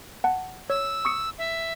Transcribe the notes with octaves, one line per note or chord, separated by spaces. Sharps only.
F#5 A5
C#5 E6
C#6 D#6 C#7
E5